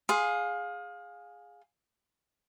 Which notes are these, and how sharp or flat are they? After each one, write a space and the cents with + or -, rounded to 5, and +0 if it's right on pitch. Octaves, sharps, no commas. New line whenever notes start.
G#4 +0 F5 +25 C6 +0